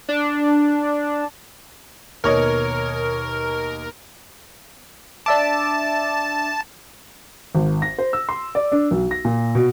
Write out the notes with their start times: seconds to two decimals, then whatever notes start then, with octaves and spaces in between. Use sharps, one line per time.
0.09 D4
2.24 D#2 B2 A#3 A#4 C#5 D#5
5.26 D4 E5 A5 D6
7.55 G#1
7.82 A#6
7.98 C5
8.13 E6
8.29 C6
8.55 D5
8.72 D4
8.91 B1
9.11 A#6
9.25 A#2
9.55 B2